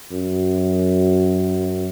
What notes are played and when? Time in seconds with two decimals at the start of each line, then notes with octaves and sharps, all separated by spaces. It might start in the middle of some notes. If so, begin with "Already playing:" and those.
0.11 F#2